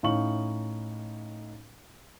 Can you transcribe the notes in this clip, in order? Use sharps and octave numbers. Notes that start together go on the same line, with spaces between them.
A2 C#4 D#4 F5 C#6 F#7